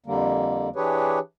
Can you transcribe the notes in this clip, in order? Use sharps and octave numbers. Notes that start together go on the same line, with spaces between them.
F2 D3 G3 A#3
E3 D4 G4 G#4 B4 C#5